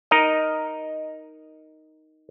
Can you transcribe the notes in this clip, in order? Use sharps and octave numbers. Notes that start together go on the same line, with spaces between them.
D#4 A#4 D#5